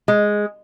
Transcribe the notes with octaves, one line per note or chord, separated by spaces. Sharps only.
G#3